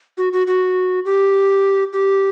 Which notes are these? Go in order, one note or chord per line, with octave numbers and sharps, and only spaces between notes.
F#4
F#4
F#4
G4
G4